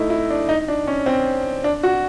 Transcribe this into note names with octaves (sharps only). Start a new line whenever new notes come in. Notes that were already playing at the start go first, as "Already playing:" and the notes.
Already playing: A3 D#4 E4
E4
D4
D#4
D4
C#4
C4
D4
F#4